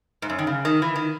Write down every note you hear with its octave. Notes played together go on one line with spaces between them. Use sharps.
G#2
F#2
D#3
C#3
D#3
E3
D#3